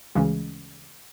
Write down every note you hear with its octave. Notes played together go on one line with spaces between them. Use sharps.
D2 C#3 E3 G#3 C#4